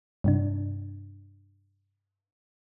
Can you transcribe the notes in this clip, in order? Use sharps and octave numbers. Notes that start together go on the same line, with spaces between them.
G2 C3 D4